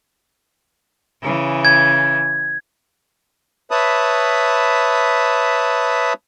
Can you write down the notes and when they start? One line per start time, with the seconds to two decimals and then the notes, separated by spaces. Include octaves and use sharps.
1.22 C#3 E3
1.65 G#6
3.71 B4 C#5 E5 A5 B5 D#6